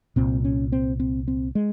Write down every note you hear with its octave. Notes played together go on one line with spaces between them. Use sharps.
C2 A#2 C4
C#4
C4
C4
C4
G#3